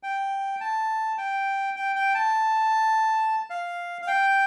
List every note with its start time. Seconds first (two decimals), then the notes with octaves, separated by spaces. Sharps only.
0.03 G5
0.61 A5
1.18 G5
1.76 G5
1.96 G5
2.14 A5
3.50 F5
4.02 F5
4.07 G5